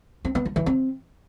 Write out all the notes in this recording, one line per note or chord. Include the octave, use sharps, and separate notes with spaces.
C4
B3
F3
E3
C4